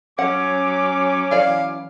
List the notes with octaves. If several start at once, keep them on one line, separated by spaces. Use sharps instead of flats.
F#3 C#4 F#5 D6
E3 D5 F5